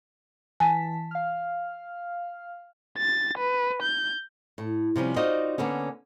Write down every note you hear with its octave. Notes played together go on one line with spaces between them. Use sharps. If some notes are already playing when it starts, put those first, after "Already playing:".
E3 G#5 A5 B6
F5 F6
A6
B4
G6
A2
C3 F3 G3 C#4
D#4 F4 F#4 C5 D5 D#5
D3 A#3 B3 C#4